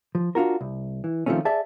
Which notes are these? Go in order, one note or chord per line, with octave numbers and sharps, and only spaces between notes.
F3
D4 F4 F#4 A#4
C2
E3
D#3 F3 F#3 A3 C4 C#4
G#4 D5 E5 A5